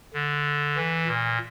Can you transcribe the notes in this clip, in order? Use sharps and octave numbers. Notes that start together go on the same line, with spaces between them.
D3
E3
A#2